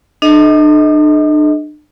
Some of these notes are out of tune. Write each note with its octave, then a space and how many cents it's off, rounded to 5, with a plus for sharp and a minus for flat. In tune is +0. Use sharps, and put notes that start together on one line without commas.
D4 +40 A4 -40 D#5 +25